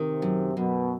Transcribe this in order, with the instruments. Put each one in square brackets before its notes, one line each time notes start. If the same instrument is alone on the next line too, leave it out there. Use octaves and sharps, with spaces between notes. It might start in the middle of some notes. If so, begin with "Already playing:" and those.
Already playing: [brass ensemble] C3 [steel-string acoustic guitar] D#3
[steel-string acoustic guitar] F#2
[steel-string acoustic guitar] F#2 [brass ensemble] B2